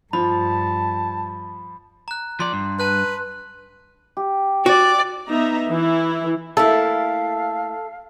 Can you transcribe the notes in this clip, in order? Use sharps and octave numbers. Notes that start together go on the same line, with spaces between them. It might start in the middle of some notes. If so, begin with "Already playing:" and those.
G2 F3 A5 B5
A#5 F#6
F3 D5 C6
G2
B4 A5 F#6
G4
F#4 D5
B3 D#4 E5 A#5
E3 E4
A3 A#3 E4 A4 F5